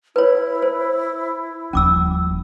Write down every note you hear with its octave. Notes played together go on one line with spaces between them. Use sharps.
E4 B4 C#5
C5
D#1 F3 C#4 D6 E6